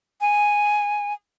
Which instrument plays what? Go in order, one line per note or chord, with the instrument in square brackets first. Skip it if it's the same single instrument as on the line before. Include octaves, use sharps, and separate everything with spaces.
[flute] G#5